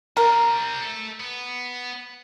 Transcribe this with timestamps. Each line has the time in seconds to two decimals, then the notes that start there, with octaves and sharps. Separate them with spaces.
0.17 G3 C4 A#4
0.81 A4 E5
1.20 B3